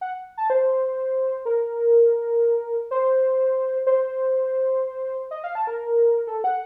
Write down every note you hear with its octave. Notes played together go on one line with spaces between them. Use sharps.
F#5
A5
C5
A#4
C5
C5
D#5
F5
A5
A#4
A4
F#5